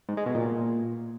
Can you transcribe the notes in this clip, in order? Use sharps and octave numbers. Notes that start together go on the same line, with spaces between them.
G#2
G#3
B2
A#2